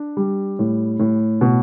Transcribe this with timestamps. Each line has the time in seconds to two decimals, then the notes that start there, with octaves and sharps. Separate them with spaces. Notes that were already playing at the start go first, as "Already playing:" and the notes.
Already playing: D4
0.17 G3
0.59 A2
0.99 A2
1.41 B2